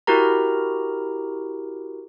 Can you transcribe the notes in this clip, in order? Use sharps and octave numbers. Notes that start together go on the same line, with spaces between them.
E4 F#4 G4 A#4 A#5